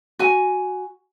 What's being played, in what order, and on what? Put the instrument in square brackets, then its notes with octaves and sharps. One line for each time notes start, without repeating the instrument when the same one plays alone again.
[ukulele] F#4 G#5